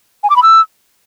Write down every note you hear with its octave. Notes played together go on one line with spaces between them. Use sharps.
G#5
D6
B5
E6